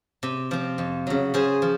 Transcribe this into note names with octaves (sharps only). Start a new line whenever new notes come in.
C3
F3 C4
F2
C#3 F#3
C#3 G#4 C5
F3